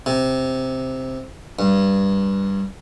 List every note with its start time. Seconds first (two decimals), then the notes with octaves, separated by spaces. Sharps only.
0.06 C3
1.59 G2